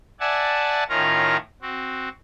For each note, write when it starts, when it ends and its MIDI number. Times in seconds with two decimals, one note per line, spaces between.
0.20 0.84 74
0.20 0.84 76
0.20 0.84 78
0.20 0.84 80
0.20 0.84 81
0.89 1.37 45
0.89 1.37 51
0.89 1.37 61
0.89 1.37 65
0.89 1.37 70
0.89 1.37 82
1.62 2.09 60
1.62 2.09 66